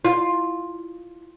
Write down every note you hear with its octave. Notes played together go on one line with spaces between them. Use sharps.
F4